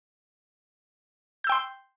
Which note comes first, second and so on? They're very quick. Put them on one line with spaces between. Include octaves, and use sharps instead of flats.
G6 E6 G5 C6